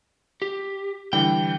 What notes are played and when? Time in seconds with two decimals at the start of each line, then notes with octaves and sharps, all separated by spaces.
0.42 G4
1.13 D3 E3 G3 G5